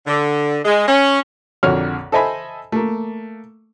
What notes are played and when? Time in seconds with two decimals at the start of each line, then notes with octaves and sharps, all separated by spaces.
0.07 D3
0.64 G#3
0.87 C#4
1.63 A#1 F2 D3 F#4 C#5 F6
2.12 A4 C5 D#5 E5 G#5 B5
2.72 A3 A#3